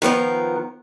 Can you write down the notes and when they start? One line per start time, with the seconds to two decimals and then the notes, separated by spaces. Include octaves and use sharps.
0.02 D#3 F3 B3 A#4